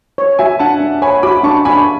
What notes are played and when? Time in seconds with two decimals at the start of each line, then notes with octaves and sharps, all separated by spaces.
0.18 C#5
0.39 F#4 E5 G#5
0.59 D4 F#5 A5
0.80 D4
1.02 C#5 G#5 B5
1.23 F#4 B5 D6
1.44 D4 A5 C#6
1.65 D4 G#5 B5